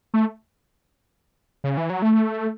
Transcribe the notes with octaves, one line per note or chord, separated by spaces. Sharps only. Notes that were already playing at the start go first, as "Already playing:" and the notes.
A3
C#3
E3
F#3
A3